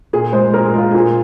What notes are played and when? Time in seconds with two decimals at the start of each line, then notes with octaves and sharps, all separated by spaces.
0.13 A#2 G#4
0.33 G#3 C5
0.54 A#2 A#4
0.65 G#4
0.74 G#3 F4
0.91 A#2 G#4